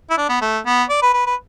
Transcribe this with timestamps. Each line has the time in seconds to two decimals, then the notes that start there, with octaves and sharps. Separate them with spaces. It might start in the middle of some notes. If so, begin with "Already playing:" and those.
0.10 E4
0.17 D4
0.29 B3
0.41 A3
0.66 B3
0.89 D5
1.02 B4
1.14 B4
1.26 B4